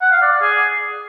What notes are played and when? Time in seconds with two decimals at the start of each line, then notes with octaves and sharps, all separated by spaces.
0.01 F#5
0.12 F5
0.22 D5
0.32 D5
0.42 G#4